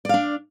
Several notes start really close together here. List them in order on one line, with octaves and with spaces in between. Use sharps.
D5 F5 D4